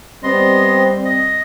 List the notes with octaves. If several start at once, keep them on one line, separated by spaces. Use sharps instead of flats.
G3 B3 C4 D#5 C6
D#5